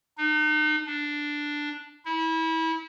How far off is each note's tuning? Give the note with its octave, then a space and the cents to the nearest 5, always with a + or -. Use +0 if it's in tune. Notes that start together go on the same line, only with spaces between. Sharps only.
D#4 -35
D4 +0
E4 -25